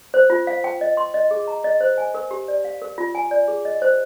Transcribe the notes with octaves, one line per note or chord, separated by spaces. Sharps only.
C5
F4
F5
G5
D#5
C6
D#5
G#4
A#5
D#5
C5
G#5
A#4
G4
D5
F5
A#4
F4
G#5
D5
G#4
D#5
C5